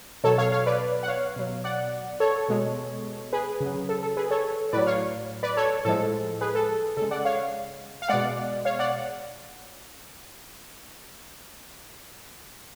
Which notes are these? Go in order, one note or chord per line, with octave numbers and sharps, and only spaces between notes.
B2 F#3 A4 C#5
C#5 F5
C#5 F5
B4 D5
F#5
C#5 F5
B2 F#3
D5 F#5
A4 C#5
B2 G#3
G#4 B4
C#3 F#3
A4
A4
G#4 B4
A4 C#5
A2 F#3 B4 D5
C#5 F5
B4 D5
A4 C#5
A2 F3 G#3 A4
G#4 B4
A4
C#3 G#3 A4
D5 F#5
C#5 F5
F5
B2 G#3 D5 F#5
C#5 F5
D5 F#5